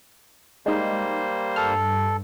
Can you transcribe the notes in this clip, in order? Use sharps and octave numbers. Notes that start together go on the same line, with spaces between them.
G3 G#3 A#3 D#4 C5
G2 A4 F6